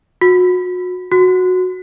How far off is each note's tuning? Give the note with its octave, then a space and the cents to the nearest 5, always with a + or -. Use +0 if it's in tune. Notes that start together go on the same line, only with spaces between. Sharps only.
F#4 -35
F#4 -10